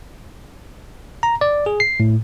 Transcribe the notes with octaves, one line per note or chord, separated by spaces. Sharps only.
A#5
D5
G#4
C7
A2